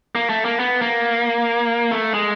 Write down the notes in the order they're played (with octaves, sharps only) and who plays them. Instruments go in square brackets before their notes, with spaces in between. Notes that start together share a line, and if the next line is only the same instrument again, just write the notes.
[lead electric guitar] A#3
A3
A#3
B3
A#3
A3
G#3